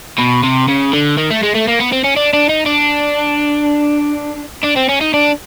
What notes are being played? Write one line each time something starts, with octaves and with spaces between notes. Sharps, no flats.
B2
C3
C#3
D3
D#3
A3
G#3
A3
A#3
B3
C4
C#4
D4
D4
D#4
D4
D4
C4
C#4
D#4
D4